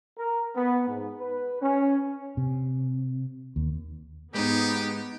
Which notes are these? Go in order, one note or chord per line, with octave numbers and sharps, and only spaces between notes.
A#4
B3
G#2
B4
C#4
C3
D#2
G#2 G#3 B3 D#4 G4